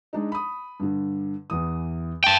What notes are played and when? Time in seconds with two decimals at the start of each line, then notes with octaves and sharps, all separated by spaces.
0.13 G#3 D4 D#4
0.32 B5 D#6
0.80 G2 D3
1.50 E2 E3 D#6
2.24 G5 A5